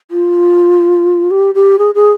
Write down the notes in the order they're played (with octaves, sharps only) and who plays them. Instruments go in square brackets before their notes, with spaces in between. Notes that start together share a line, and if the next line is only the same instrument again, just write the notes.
[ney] F4
G4
G4
G#4
G#4